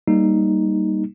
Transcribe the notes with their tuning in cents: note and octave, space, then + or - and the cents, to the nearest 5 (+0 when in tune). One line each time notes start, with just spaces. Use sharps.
G3 +0 A#3 +0 D#4 +0